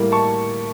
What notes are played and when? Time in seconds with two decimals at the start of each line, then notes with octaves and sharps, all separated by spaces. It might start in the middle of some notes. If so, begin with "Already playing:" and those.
Already playing: A2 G3 A#3
0.12 A5 C#6